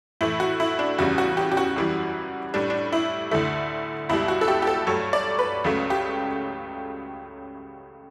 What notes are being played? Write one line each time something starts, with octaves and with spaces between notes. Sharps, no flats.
A2 E3 A3 E4
F#4
E4
D4
E2 C#3 G3 F#4
F#4
G4
G4
F#4
F#2 E3 G3
A2 G3 D4
D4
E4
D2 D3 A3 E4
C#2 B2 G3 E4
F#4
A4
G4
G4
A4
G2 F#3 A3 C#5
D5
B4
C#2 C#3 F#3 A3
G4